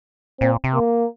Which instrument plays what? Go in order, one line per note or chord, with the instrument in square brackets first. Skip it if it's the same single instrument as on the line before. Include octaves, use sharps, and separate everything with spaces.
[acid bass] A#2 [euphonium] C4
[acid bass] C3
[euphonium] A#3